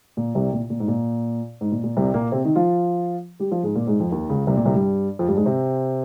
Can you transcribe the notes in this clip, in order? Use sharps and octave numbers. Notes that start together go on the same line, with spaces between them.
A#2
C2 C3
A#2
A#2
G#2
A#2
G#2
A#2
A#2
C2 C3
A#2 A#3
C3 C4
D#3 D#4
F3 F4
G3 G4
F3 F4
G#2 G#3
A#2 A#3
G#2 G#3
F2 F3
D#2 D#3
C#2 C#3
C2 C3
A#2
C2 C3
G2 G3
F2 F3
G2 G3
G#2 G#3
C3 C4